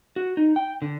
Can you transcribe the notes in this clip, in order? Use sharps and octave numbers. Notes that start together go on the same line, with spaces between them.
F#4
D#4
G5
D3